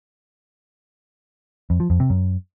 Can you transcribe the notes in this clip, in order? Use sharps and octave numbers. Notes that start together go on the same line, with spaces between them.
F2
F3
F2
C3
F#2